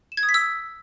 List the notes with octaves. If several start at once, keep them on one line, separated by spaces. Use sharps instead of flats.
E7
G#6
D#6
B6
E6